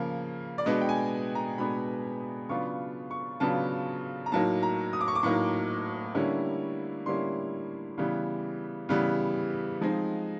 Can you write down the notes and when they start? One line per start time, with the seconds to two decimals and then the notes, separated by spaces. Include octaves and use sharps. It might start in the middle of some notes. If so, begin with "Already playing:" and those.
Already playing: C#3 F3 A#3
0.58 D5
0.66 B2 G#3 B3 D4 D#5
0.82 G5
0.89 G#5
1.35 A#5
1.58 B2 G#3 B3 D4 B5
2.49 C#3 F#3 B3 D4 F4 C#6
3.11 C#6
3.40 C#3 F#3 B3 D4 F4 A5
4.26 A#5
4.32 A2 F#3 A#3 D#4 A5
4.63 A#5
4.93 D#6
5.01 D6
5.08 C#6
5.15 D6
5.23 A2 F#3 A#3 D#4 C#6
6.15 D3 G3 A#3 C#4 E4
7.06 D3 G3 A#3 C#4 E4 C6
7.98 C#3 E3 G3 B3
8.89 C#3 E3 G3 B3
9.81 F3 G#3 C4 D#4